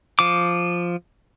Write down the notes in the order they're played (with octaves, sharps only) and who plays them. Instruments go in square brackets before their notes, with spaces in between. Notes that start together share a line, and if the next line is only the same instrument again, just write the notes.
[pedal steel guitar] F3 D6